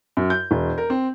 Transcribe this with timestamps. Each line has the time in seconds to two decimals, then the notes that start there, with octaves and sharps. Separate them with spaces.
0.17 F#2
0.30 G6
0.51 E1
0.78 A#4
0.90 C4